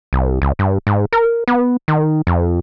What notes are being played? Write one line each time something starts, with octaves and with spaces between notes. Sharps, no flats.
C2
C#2
G2
G#2
A#4
B3
D#3
F2